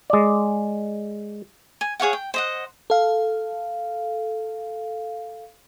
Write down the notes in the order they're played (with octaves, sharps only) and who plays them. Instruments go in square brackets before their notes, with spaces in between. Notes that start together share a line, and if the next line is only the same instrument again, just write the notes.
[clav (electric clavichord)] G#3 D5
[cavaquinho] G#5
G#4 C#5 F5 F#5
G5
C5 D#5 F#5
[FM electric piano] A4 F5